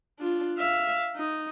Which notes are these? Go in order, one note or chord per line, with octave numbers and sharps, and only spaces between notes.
D4 F4
E5 F5
D#4